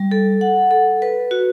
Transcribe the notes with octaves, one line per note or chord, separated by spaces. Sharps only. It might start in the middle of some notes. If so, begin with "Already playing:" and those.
Already playing: G3
A4
F#5
A4
B4
F#4